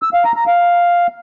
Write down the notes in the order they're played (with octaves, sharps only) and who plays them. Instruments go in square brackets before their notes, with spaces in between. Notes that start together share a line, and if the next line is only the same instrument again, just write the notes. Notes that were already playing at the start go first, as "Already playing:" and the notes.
[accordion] E6
F5
A#5
A#5
F5